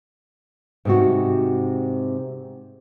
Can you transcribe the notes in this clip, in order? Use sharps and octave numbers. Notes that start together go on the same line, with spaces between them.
G#2 C3 F#4